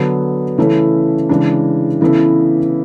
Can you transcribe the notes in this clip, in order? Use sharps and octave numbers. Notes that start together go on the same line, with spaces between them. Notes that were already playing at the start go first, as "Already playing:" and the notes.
Already playing: D3 F#3 B3
C#3 E3 A3 C#4 E4
C#3 E3 G#3 D4
C#3 E3 B3 E4 A4